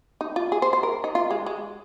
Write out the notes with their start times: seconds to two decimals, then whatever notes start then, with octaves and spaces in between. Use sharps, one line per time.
0.21 D#4
0.36 F4
0.52 G#4
0.62 C5
0.73 C5
0.83 A#4
1.04 D#4
1.15 F4
1.31 G#3
1.46 G#3